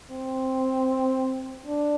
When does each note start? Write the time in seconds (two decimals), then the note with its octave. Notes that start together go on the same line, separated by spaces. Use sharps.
0.11 C4
1.66 D4